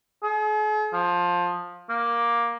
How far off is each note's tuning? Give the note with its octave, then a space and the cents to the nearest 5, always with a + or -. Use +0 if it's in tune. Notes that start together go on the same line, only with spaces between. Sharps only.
G#4 +45
F3 +15
A#3 +10